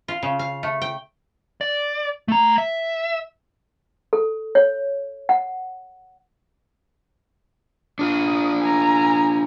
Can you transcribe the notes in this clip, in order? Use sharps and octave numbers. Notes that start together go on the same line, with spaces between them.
F4
C#3
F5
A3
G5
D5
A3 A#5
E5
A4
C#5
F#5
D4 F4 D5 D#6
G#5 A#5